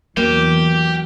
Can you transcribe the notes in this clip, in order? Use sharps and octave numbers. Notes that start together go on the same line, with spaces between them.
E2 F#3 A#3 G4